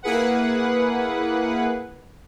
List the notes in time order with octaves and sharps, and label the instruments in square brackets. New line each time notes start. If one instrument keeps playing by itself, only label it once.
[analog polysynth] A#3 E4 G#4 B4 F#5